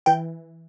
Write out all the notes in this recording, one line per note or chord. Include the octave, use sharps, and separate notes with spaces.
E3 G5